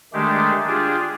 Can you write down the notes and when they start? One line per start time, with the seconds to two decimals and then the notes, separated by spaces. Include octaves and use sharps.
0.13 D#3 G#3 A3 D4 G4
0.67 D4 F4 G4 G#4